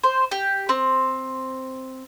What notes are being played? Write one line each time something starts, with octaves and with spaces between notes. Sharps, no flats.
C5
G4
C4